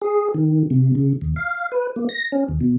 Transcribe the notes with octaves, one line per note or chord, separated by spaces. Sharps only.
G#4
D#3
C3
C#3
D#2
F5
B4
A#3
A#6
C#4
D#2
B2